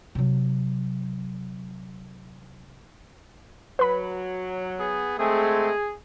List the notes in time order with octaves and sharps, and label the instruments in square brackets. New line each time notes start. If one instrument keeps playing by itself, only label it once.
[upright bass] C3 F#3
[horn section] F#3 [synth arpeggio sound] B4 B5
[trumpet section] B3 G#4
[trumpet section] G#3 C4 [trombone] A3 [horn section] G#4